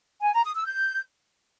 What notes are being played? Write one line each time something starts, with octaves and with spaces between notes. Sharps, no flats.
G#5
A#5
D#6
E6
G6